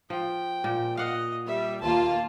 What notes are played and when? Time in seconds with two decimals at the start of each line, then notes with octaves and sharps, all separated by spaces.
0.10 F3 G5
0.64 A#2
0.97 D#5 F5 F#5
1.47 G3 E5
1.81 D#2 A#3 F4 A5